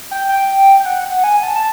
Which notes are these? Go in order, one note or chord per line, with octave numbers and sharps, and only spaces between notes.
G5
G5
G5
F#5
F#5
G#5
A5
A5